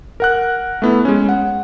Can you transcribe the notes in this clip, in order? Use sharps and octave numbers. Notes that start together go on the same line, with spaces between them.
A#4 F#5 F#6
A3 B3 E4
G#3 C#4
F#5